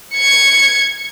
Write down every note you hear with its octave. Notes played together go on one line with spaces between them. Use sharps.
G#6 C#7